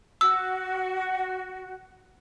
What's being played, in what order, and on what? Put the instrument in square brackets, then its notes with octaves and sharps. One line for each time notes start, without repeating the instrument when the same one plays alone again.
[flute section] F#4 [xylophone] E6